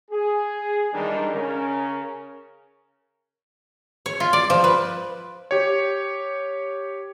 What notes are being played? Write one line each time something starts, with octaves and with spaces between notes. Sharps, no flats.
G#4
E2 D#3 G3 G#3 D4 D#4
C#3 C#4 A#4
C#5
F4
D5
F3
B4
G4 C#5